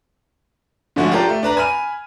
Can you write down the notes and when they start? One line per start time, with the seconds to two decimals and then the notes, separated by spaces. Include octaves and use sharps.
0.96 G#2 D3 F3 A3 C#4 F#4
1.11 D4 F4 G4 A4 A#4
1.29 A3
1.43 D4 B4 A#5
1.57 G#5 B5 F6 D#7